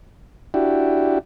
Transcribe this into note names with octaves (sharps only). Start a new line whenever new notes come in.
D4 E4 F#4 G4